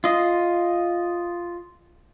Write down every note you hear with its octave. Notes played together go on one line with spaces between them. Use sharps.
F4 D#5